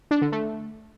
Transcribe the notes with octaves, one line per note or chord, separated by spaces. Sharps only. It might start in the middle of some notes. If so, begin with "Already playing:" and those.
D4
D3
A3